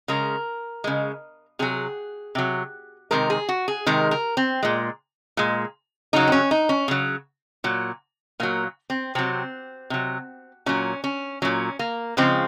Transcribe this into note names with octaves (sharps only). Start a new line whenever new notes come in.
C#3 G#3 A#4
C#3 G#3
C3 F#3 G#4
C3 F#3
C3 D#3 G#3 A#4
G#4
F#4
G#4
C3 D#3 G#3 A#4
A#4
C4
A#2 G#3
A#2 G#3
C#3 F#3 D#4
C4
C#4
D#4
C#4
C#3 F#3
A#2 F#3
A#2 F#3 A#3
C4
C3 F#3 C4
C3 F#3
A#2 F#3 C#4
C#4
A#2 F#3 C#4
A#3
C#3 F3 G#3 C4